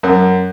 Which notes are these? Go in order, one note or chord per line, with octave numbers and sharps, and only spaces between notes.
F#2